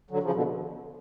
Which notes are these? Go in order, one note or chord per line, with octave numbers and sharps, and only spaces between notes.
D3 F#3
C#3 F3
B2 D3